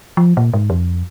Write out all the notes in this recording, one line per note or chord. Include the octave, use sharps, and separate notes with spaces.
F3
A#2
G#2
F2